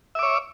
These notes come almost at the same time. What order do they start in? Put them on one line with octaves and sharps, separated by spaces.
E5 D6 C#5